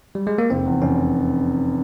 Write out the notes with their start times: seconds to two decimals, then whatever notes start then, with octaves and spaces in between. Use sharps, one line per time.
0.15 G3
0.27 G#3
0.38 A#3
0.50 F1 C4
0.65 E2
0.82 F1 C#4